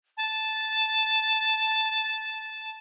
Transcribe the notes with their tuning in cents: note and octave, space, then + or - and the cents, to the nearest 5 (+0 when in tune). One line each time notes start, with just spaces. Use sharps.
A5 -10